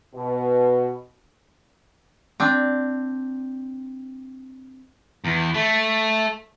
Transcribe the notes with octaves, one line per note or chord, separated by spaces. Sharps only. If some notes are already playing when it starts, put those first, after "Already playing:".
B2
C4 D4
E2
A3